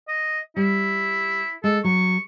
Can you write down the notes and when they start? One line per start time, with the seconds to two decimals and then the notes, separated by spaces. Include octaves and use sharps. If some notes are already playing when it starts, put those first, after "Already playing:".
0.08 D#5
0.56 G3 E4
1.64 G#3 A4
1.84 F#3 C#6